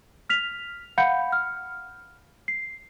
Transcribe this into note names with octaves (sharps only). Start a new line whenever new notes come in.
F6 B6 F7
F5 F#5 B5 G6 C#7
F6
C7